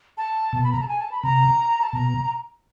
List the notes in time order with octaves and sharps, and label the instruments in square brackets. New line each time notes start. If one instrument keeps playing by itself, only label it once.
[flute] A5
[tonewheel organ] B2
[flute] B5
A#5
A5
G#5
A5
B5
[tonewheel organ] C3 [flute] A#5
[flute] A5
[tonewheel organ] B2 [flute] A#5